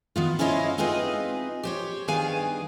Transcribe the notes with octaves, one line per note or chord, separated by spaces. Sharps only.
D#3 B3 F4
C#4 E4 C5 C#5 D#5 F5
C4 D#4 F4 G#4 B4 D#5
G4 C5 C#5
G2 D#3 B3 G#4 F5 G#5